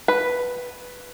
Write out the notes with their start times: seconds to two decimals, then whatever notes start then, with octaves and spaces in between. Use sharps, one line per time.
0.08 B4